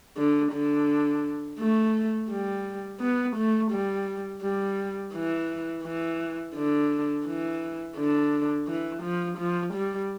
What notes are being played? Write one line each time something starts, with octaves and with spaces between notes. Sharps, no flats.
D3
D3
A3
G3
B3
A3
G3
G3
E3
E3
D3
E3
D3
E3
F3
F3
G3